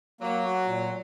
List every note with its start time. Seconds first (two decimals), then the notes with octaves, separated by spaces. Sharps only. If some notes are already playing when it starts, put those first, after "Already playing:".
0.21 F#3 A#3
0.43 F#4
0.66 A#2